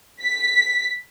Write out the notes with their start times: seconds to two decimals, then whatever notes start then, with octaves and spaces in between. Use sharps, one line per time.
0.22 B6